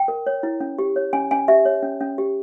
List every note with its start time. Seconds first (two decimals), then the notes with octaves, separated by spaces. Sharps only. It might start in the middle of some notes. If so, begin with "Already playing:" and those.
Already playing: G5
0.08 A#4
0.27 C#5
0.43 E4
0.60 C#4
0.79 G4
0.96 C#5
1.13 C#4 G#5
1.31 C#4 G#5
1.48 G4 E5
1.65 C#5
1.83 C#4
2.01 C#4
2.18 G4